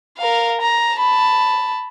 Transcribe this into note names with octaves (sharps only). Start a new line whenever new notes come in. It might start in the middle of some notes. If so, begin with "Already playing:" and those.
A#4 F5
A#5
A5 B5